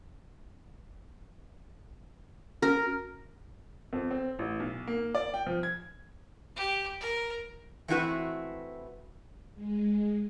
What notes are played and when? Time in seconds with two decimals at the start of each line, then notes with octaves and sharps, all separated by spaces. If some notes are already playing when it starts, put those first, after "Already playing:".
2.62 C#4 F#4 A#4
3.93 F2
4.11 C4
4.39 A1
4.60 B1
4.87 A#3
5.15 D5
5.34 G5
5.47 F3
5.63 G#6
6.57 G4
7.01 A#4
7.88 E3 A3 C4 E4 F#4 B4
9.54 G#3